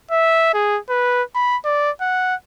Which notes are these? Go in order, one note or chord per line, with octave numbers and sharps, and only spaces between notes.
E5
G#4
B4
B5
D5
F#5